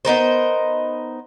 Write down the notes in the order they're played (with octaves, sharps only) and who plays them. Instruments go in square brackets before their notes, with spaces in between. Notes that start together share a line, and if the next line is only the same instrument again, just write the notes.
[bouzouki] B3 D#4 A#4 C5